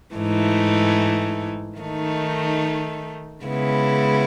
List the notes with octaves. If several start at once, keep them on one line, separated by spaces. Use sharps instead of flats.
G#2 E3 A3 D#4
D#3 A3 D#4
C#3 G#3 B3 E4